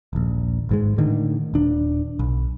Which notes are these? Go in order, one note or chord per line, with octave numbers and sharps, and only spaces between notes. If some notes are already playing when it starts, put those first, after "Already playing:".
D#1 A#1
G#1 G#2 G#3
A2 D3 D#3
D#1 D4
B1